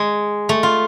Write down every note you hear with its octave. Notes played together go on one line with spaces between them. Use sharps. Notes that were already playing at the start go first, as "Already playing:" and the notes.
Already playing: G#3
A3
F4